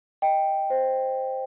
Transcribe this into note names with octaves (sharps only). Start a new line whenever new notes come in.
D#5 G5
C5